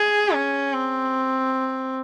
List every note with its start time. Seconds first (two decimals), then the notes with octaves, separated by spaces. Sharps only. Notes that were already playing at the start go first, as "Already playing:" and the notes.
Already playing: G#4
0.34 C#4
0.73 C4